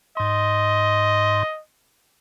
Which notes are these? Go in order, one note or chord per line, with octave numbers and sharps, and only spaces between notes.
G#2 D#5 C6